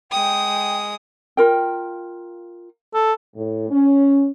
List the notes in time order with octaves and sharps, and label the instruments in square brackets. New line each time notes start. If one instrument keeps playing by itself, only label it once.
[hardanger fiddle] G#3 D#6 [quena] G5
[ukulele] F4 A#4 G5
[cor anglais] A4
[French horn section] A2
C#4